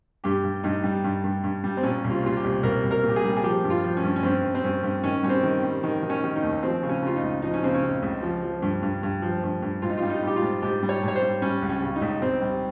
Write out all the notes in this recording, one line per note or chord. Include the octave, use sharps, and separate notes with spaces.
G2 G4
G2
G2 D#4
G3
G2
G2
G2
G3
C4
A#2 C#4
C2
F4
A#2 F4
G4
C2
C2 A#4
C2
A#4
A#2
G4
G#4
G3
G#4
F3 G4
G2
F4
F3
C#4
G2
C#4
G2 C4
G2
C4
G2 C#4
G2
D#3 C#4
G3 C#4
C4
D#3
G3
D#3
D#3
C#4
D#3
D#4
D#2
F3 C4
C#3
C#4
C#3 F4
D#4
C#2
F3 D#4
C#4
C#3 C4
C#4
C#3
C#2
F3
F3
G2
G2
G2
F3
G2
G2
G#2 F4
D#4
G3 F4
D#4
G3 G4
F4
G#2
G#2 G4
G3
C#5
G#2 C#5
C5
G3
G3 C#4
C#2
C#4
C#3
D#4
C#2
C#2 C4
G3